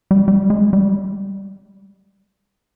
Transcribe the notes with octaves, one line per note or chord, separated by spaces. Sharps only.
G3
G3
G#3
G3